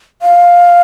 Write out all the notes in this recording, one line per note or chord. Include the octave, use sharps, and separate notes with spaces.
F5